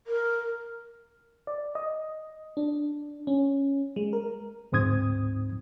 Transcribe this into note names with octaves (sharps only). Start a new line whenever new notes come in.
A#4
D5
D#5
D4
C#4
G#3
A#4
D2 G#2 C4 D#6 G#6